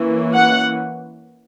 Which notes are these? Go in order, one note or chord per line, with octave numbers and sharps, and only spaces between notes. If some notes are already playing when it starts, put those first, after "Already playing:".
Already playing: E3 A#3 C#4
F#5